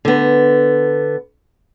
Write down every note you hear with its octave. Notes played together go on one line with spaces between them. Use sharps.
D3 B3